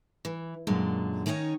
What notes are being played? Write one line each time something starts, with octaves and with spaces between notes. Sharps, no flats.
E3
F#2 A#2 D3 G#3
D#3 C#4 D#4 E4 C#5